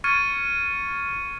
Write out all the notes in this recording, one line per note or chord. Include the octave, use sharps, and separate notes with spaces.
C#6 F6 G#6 A6 C#7 D#7